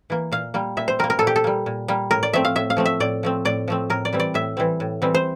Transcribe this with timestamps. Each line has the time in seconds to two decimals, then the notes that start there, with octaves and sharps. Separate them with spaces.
0.10 E3 A#3
0.32 A#2 F5
0.54 G3 A#3
0.77 A#2 E5
0.88 C5
0.99 G3 A#3 A#4
1.10 A#4
1.19 A#2 A4
1.27 G4
1.36 A4
1.44 G3 A#3
1.66 A#2
1.88 G3 A#3
2.11 A2 A#4
2.23 D5
2.33 F3 A3 C4 E5
2.45 F5
2.55 A2 E5
2.70 F5
2.77 F3 A3 C4
2.86 E5
3.00 A2 D5
3.23 F3 A3 C4
3.45 A2 D5
3.68 F3 A3 C4
3.90 A2 A#4
4.05 D5
4.13 E3 G3 C4
4.20 D5
4.34 A2 E5
4.57 E3 G3 C4
4.80 A2
5.02 E3 G3 C4
5.14 C5